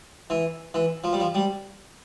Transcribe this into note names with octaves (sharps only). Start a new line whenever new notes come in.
E3
E3
F3
G3
F3
G3